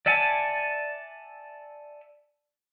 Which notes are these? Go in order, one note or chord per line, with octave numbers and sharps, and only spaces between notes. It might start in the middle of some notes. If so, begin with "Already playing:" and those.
D5 E5 F#5 G#5 A5